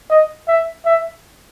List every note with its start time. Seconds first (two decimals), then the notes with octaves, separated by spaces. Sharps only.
0.10 D#5
0.48 E5
0.86 E5